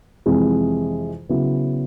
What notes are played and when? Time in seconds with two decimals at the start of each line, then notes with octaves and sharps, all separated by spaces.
0.26 F2 C3 E3 G#3
1.29 C#3 F#3 B3 E4